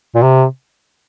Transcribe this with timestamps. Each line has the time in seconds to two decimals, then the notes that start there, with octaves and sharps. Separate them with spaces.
0.15 A#2
0.23 C3